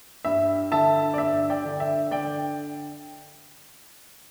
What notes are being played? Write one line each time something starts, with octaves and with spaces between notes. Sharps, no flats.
G2 E5
D3 E5 A5
D5
G2 E5
D5 G5
D3
E5
D3 D5 G5